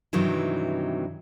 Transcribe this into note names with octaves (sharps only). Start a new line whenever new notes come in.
G2 C3 D#3 E3 F#3